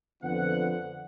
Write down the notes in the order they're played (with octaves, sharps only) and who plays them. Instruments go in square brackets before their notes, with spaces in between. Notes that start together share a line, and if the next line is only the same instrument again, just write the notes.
[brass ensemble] F2 D3 F3 B3 F#5